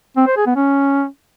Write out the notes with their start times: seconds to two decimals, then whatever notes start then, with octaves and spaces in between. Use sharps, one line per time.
0.17 C4
0.27 C5
0.37 G#4
0.46 B3
0.56 C#4